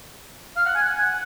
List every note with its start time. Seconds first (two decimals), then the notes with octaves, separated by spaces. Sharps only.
0.56 F5
0.66 F#5
0.75 G#5
0.85 F#5
0.94 G#5
1.04 F#5